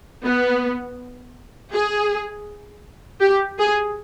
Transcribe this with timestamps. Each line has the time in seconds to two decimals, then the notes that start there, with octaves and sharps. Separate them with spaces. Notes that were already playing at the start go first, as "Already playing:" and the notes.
0.24 B3
1.73 G#4
3.21 G4
3.59 G#4